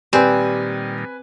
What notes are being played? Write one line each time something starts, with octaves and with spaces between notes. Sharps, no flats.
A#2 D#3 G3 C4 G4 B4 D5 G#5